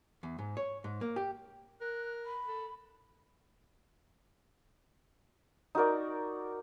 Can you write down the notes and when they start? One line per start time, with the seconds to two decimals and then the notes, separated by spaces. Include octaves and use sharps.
0.23 E2
0.39 G#2
0.57 C#5
0.84 G#2
1.01 A#3
1.16 G4
1.81 A#4 F#6
2.26 B5
2.46 A4
5.75 D#4 F#4 A#4 D5